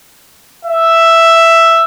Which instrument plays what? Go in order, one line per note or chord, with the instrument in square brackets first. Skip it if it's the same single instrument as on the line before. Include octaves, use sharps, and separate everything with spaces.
[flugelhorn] E5